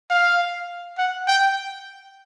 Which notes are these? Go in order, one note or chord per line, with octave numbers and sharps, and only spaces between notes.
F5
F#5
G5